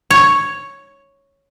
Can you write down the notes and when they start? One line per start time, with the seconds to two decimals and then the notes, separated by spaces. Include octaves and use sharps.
0.10 C#5